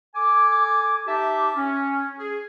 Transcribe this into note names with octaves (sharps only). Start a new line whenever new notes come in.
A4 G#5 D6
D#4 G4 E5 A5 D6
C#4
G#4